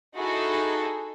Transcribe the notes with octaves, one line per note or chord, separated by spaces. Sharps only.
D#4 E4 F#4 G#4 A4